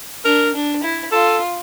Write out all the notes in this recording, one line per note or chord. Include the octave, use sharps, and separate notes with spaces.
D4 A#4
D4
E4
F4 A4